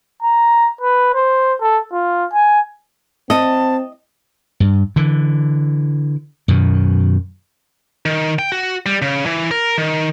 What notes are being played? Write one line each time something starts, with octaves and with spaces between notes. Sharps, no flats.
A#5
B4
C5
A4
F4
G#5
C4 D#5 A5
G2
D3 E3
F#2 B2 D#3
D#3
G5
F#4
G3
C#3
E3
A#4
D#3